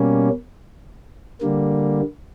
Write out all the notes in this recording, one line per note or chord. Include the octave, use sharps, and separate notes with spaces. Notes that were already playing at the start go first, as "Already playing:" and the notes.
Already playing: B2 G3 A#3 C#4
D3 G3 A#3